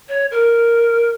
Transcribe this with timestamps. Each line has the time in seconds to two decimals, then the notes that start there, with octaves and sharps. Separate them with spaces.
0.09 C#5
0.31 A#4